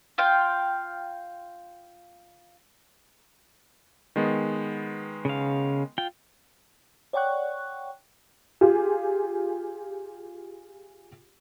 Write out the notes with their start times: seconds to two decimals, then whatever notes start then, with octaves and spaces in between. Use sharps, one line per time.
0.18 F4 F5 G5
4.16 D#3 G#3 B3
5.25 C#3 F5
5.98 F4 G5
7.13 C#5 D5 F#5 G5 C#6 F#6
8.61 F4 G4 G#4